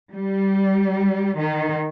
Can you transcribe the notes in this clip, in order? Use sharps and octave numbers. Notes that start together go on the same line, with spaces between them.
G3
D#3